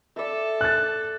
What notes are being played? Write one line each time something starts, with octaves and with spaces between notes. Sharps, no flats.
A4 D5 E5
F#6 A6